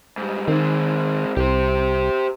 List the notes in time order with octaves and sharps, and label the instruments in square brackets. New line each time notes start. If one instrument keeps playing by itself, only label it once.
[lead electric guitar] G#2 G3
[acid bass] D#3 [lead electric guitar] G#3 C4
[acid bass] C2 [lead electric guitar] G4 C5